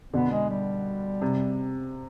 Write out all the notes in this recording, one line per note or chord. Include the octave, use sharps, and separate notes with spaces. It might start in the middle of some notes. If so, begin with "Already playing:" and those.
B2 D3 B3
G#3
G3
C3